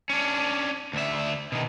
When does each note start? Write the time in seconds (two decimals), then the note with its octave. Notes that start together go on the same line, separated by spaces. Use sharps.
0.10 C#4 D4
0.93 D2 E5
1.52 B2 D#3